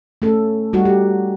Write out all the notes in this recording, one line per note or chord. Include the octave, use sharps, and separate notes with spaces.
A3 C#4 A4
G3 D#4 F#4
G4